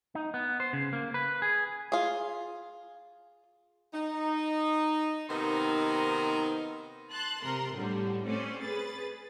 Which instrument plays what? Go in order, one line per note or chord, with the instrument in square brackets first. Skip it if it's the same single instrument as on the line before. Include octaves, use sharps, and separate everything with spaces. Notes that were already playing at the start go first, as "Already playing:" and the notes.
[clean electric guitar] D#4
B3
C5
C#3
A#3
B4
G#4
[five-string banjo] F4 G#4
[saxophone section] D#4
C3 D#3 B3 C4 D#4 A#4
[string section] A5 C6 F#6
C3 A#4 A#5 C6
A2 D3 G3
A3 C4 C#4 C5 D5
G#4 B4 A6